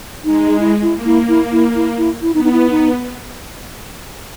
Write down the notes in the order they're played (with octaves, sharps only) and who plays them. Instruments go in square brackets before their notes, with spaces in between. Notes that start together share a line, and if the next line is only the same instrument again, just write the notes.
[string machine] G#3 [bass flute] D#4
[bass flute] E4
E4
[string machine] A#3
[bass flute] E4
E4
E4
E4
E4
E4
[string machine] B3 [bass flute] D#4
[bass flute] D#4
E4
D#4